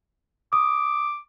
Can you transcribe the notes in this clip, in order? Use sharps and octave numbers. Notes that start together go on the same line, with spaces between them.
D6 D#6